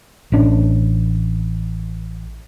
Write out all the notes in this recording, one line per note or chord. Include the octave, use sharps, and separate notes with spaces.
A1 C#4 D4